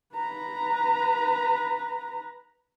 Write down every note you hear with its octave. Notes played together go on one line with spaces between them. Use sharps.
B4 A#5